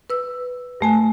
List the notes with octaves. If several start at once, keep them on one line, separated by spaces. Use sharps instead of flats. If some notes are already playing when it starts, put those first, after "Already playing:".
B4 E6
G2 A3 G#5